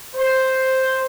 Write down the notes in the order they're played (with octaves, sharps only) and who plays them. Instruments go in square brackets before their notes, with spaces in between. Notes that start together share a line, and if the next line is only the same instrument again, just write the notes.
[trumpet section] C5